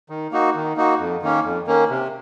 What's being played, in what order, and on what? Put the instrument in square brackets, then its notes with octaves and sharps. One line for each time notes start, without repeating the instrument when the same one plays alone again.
[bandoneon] D#3
A#3 D#4 F#4
D#3
A#3 D#4 F#4
F2
D#3 A#3 C#4
F2
D#3 A#3 C#4
C3